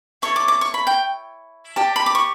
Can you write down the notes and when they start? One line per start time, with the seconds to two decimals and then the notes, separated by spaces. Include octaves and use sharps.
0.22 E4 A4 C#5 C#6
0.36 D6
0.48 D6
0.61 C#6
0.74 B5
0.87 G5
1.76 G4 D5 A5
1.96 B5
2.06 D6
2.15 C#6